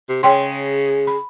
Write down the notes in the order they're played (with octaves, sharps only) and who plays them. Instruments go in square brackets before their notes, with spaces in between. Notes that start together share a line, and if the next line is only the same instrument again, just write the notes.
[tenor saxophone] C3
[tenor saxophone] C#3 [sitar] G#3 G#4 [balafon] C#5 G5 C6
[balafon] B5